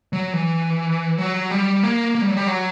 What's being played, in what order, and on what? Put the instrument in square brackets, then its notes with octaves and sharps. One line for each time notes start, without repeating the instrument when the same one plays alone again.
[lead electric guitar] F#3
E3
F#3
G3
A#3
A#3
G3
F#3
G3
F#3